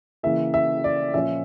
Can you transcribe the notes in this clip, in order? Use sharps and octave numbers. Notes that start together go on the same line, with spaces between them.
C#3 E3 A#3 E5
E5
D5
A#2 F3 C#4 E5